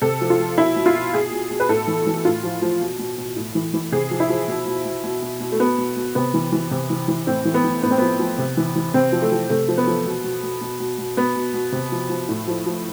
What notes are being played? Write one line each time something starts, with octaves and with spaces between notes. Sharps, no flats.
C3 A4
F3
F4
F3
B2 E4
B2
F4
B2
B2 G#4
B2
B2
B4
A2 A4
E3
E3
A2 F4
F3
F3
B2
B2
B2
A2
E3
E3
C3 G#4
F3
E4
F3
B2
B2
B2
B2
B2
B2
A3
B2 B3
B2
B2
C3 B3
E3
E3
C3
E3
E3
A2 C4
E3
B3
E3
A2 B3
C4
F3 B3
F3
C3
E3
E3
C3 C4
F3
A3
F3
C3 A3
F3
B3
F3
B2
B2
B2
B2
B2
B2
B2 B3
B2
B2
C3
F3
F3
A2
F3
F3